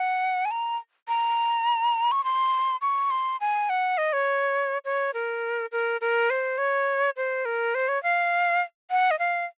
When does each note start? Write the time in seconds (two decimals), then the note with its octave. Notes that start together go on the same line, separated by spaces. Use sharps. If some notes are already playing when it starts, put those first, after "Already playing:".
Already playing: F#5
0.45 G#5
0.51 A#5
1.08 A#5
2.12 C#6
2.24 C6
2.81 C#6
3.11 C6
3.41 G#5
3.70 F#5
3.98 D#5
4.13 C#5
4.85 C#5
5.14 A#4
5.72 A#4
6.01 A#4
6.30 C5
6.58 C#5
7.17 C5
7.45 A#4
7.75 C5
7.88 C#5
8.03 F5
8.91 F#5
9.11 D#5
9.19 F5